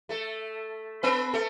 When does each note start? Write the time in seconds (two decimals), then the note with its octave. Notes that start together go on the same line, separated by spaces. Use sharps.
0.09 A3 A4
1.03 B3 B4
1.34 A3 A4